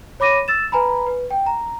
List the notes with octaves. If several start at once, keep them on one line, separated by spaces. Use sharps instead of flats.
C#5 B5 D6 A#6 D#7
E6 A6 E7
B4 G#5 A#5 B5
B4
G5
A#5